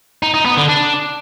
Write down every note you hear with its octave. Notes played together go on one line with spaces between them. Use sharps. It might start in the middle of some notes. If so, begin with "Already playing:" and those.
D#4
D#4
B3
D3
D4